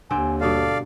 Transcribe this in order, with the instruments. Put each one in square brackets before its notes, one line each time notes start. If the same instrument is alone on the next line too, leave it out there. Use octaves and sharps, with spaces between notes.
[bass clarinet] D#2 [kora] D3 C4 [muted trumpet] G#5
[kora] G2 B2 A#3 [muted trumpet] A4 [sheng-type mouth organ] D5 F5